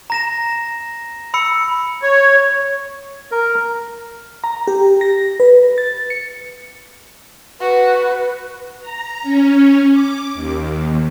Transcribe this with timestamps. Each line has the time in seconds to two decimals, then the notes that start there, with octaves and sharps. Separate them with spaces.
0.10 A#5 A#6 E7
1.34 B5 E6 C#7
2.03 C#5
3.31 A#4
4.44 A#5
4.67 G4
5.01 A#6
5.40 B4
5.78 A6
6.10 C#7
7.60 F#4 B4
8.81 A#5
9.23 C#4
9.92 D6
10.34 D#2